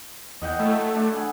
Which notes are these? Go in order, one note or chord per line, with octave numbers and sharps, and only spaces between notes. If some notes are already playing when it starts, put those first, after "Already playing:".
E2 D#5 F#5 G5
F#3 A3 E4 A4
D4 D6
G#4 F#5 G#5